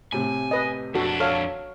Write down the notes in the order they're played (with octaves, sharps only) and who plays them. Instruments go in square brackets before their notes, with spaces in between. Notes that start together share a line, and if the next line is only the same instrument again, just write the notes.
[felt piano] A2 C3 [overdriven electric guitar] G#5
[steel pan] B4 D#5
[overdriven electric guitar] F2 D4 [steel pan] F#4 A4
[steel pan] A4 C#5 F5 [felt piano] F#5 C#6 F6